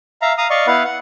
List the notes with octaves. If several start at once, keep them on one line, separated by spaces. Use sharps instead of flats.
E5 F5 A#5
F5 A#5 D#6
D5 D#5 F5 C#6
B3 E4 B4 F5 F#5
F#5